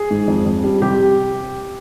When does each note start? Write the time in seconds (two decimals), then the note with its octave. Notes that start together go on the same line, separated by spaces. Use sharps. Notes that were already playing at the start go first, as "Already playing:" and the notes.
Already playing: G#4
0.10 G#2
0.27 F2
0.45 F2
0.64 G3
0.82 C3 G4